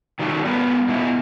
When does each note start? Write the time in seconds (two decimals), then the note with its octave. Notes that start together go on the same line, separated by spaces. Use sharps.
0.19 D#3 F#3 G3 A3
0.45 G3 B3 A#4 B4
0.88 B2 A#3 E4